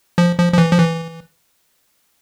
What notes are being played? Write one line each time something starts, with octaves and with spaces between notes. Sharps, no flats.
F3
F3
F3
E3
F3
E3